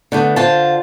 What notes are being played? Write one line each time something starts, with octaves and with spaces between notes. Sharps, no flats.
D3 A3 B3
D3 F4 C5 A5